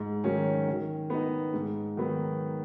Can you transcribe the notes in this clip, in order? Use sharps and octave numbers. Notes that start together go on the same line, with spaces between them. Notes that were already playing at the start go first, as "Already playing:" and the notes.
Already playing: G#2
D#3 F#3 C#4
D#3
B3 D#4
G#2
D#3 F#3 B3